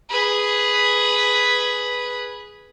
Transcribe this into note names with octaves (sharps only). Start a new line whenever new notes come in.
G#4 B4